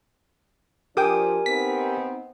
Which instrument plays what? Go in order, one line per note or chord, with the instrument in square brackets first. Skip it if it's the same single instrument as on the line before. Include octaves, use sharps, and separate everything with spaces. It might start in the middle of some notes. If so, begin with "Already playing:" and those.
[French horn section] F3 D4 [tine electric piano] G4 [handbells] A#4 G#5 [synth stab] G5 D6 D#6
[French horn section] B3 C4 D#4 [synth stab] B6